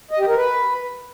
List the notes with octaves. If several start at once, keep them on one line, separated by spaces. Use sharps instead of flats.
D#5
G4
A#4
B4